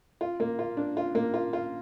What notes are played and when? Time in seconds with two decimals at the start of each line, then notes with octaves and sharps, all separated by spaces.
0.21 F4
0.40 A#3
0.59 F4
0.77 D4
0.97 F4
1.15 A#3
1.34 F4
1.53 F4